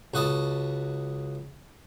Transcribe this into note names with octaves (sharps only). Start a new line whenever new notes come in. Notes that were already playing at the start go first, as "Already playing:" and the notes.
C#2 F#4 B4 D#5 A5